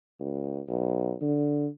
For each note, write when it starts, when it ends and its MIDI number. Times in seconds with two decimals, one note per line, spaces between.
0.20 0.60 37
0.69 1.13 35
1.21 1.67 50